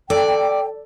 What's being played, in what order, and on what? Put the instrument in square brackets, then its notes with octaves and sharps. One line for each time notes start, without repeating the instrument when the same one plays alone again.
[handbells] A4 [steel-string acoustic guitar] D5 [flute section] G5